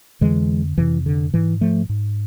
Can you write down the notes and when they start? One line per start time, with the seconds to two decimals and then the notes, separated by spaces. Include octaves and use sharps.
0.21 F2 D3 E3 G#3
0.78 F2 C3 E3
1.06 D3
1.34 G#2 E3
1.61 F3 A3
1.89 G#2